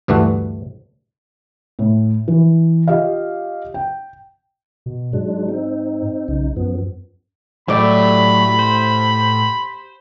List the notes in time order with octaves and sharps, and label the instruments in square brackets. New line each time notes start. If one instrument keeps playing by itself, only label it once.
[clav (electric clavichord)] D2 G2 E3 A3 F#4
[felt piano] A2
E3
F4 G4 D#5 F5
G5
[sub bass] B2
[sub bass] G#2 [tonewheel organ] F#3 G#3 D4
[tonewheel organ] C4 D#4
[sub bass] B1 [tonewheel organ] C#3 D#4
[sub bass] F#2 [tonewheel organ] F3 B3
[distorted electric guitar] A2 [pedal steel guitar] F#3 A3 [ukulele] G4 D5 [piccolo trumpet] B5
[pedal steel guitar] C5